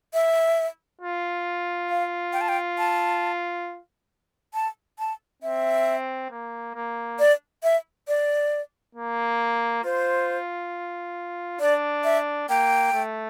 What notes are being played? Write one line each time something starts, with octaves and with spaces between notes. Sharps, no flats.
E5
F4
F5
G5
A5
G5
A5
A5
A5
C4 E5
A#3
A#3
D5
E5
D5
A#3
F4 C5
D4 D5
E5
A#3 G5
A3